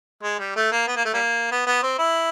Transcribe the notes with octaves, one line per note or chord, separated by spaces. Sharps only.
G#3
G3
A3
A#3
B3
A#3
A3
G3 A#3
B3
B3
C4
E4